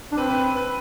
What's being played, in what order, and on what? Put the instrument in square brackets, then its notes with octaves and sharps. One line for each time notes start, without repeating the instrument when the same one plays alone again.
[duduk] D4
[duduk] C4 [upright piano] B4
[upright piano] B4
B4